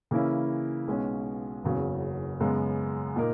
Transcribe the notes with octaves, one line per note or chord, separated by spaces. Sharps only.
C#3 E3 A#3 C#4 E4
B1 B2 G#3 C#4
F#1 E2 C#3 F#3
F#2 C#3 G#3 B3
A#2 A#3 D#4 A#4